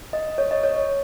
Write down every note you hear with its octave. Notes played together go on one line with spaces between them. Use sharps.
D#5
C#5
D#5
C#5